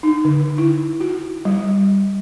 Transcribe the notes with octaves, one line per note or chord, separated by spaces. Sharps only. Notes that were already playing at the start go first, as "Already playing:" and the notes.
D#4
D3
E4
F#4
G3